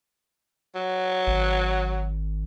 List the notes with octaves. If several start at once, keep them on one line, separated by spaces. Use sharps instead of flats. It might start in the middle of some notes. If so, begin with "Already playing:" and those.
F#3
G#1